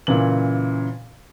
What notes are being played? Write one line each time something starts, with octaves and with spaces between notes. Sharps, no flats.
A#2 C#3 E3 F#7